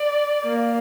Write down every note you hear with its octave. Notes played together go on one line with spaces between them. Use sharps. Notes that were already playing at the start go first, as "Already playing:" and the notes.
Already playing: D5
A#3